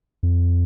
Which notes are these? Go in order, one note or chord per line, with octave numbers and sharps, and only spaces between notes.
F2